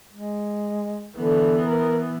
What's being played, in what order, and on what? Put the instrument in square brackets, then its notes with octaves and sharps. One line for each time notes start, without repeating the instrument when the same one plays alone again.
[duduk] G#3
[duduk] D3 [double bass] E3 B3
[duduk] A#4